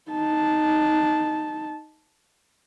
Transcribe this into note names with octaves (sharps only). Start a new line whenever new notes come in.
D#4 A5